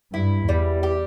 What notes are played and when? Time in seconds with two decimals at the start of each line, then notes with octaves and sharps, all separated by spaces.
0.13 G2 E4
0.48 E2 G3
0.83 G4